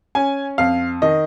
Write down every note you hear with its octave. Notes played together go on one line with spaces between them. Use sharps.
C#4 G#5
F2 F5
D#3 D#5